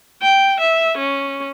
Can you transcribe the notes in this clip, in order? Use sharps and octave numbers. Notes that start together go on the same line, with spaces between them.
G5
E5
C#4